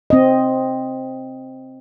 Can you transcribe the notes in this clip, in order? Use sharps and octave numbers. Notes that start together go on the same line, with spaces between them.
C4 D#5